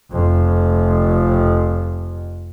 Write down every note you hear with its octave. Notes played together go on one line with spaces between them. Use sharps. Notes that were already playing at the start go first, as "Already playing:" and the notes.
F1 F2